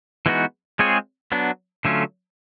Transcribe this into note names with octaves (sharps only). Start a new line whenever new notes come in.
E3 G#3 B3 D#4 F#4
G#3 C4 F4 G#4 C#5
F#3 B3 D4
D3 F#3 A3 C#4 F4